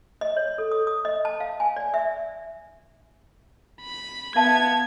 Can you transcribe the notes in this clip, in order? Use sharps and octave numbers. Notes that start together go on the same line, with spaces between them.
D#5
C#5
A4
D#6
D#6
D#5
A5
F5
G#5
D5
E5
B5
B3 E5 F5 A5 G#6